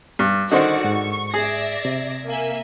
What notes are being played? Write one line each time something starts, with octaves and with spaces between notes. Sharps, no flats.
G2
D3 D#3 F#4 C5 D5 D#5 F#5
G#2 C#6
G#4 D5 E5 A#6
C3
A#3 E5 G#5